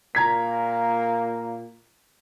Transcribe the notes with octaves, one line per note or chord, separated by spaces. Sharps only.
A#2 A#3 A#5 G#6 B6